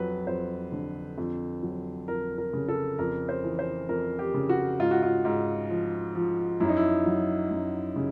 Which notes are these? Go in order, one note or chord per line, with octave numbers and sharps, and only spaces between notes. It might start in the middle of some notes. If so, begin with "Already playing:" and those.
Already playing: F2 F#3 B4
F2 C5
D3
F2
F#3
F2 A#4
A#4
C#3
A4
F2 A#4
C5
E3
C5
F2 A#4
G4
C#3
F#4
G#2 F4
F#4
F4
G#2
F3
F3
F#2 E4
D#4
E4
F#3
F#2
C#3